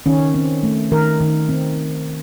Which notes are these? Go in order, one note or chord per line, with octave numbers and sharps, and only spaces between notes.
D#3 C#4
C4
A3
D#3 A#4
D#3
C4